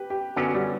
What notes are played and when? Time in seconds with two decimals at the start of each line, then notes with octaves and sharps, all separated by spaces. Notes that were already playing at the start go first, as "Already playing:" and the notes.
Already playing: G4 B4
0.10 G4
0.36 F#2 D3 F#3 B3 C#4
0.54 G3